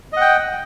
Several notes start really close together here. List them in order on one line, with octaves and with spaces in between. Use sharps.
D#5 F#5 G5